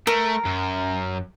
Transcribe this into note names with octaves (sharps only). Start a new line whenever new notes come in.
A3 A#4
F#2